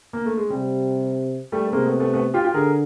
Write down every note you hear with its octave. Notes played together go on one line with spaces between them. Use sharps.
A#3
A3
G#3
C3 G3
G3 A3
A3
C3 G#3 A#3
A3 B3
A3 B3
A3 B3
F4 G4
F4 G4
D3 G#4 A#4